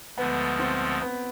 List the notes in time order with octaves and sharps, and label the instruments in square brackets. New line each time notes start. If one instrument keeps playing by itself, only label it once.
[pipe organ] D2 D3 F3 G#3 [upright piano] B3
[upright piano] C4
B3